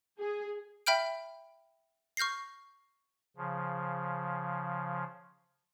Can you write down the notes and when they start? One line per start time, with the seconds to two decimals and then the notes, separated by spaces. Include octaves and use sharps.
0.19 G#4
0.86 E5 G5 B5 F6 G6 D7
2.17 C#6 F6 G6 A#6 C7
3.37 C#3 F3